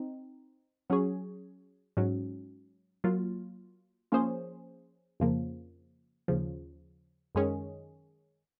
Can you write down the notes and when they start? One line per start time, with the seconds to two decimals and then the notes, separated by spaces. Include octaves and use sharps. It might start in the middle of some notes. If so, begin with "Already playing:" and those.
Already playing: C4 D#4
0.90 F#3 C#4 G#4 C#5
1.97 G#2 F#3 C#4
3.04 F#3 A#3 F4
4.12 F3 A#3 C#4 G#4 C5
5.20 F2 C#3 F3 A#3
6.28 D#2 C#3 F3
7.35 F#2 D#3 G#3 C#4 G#4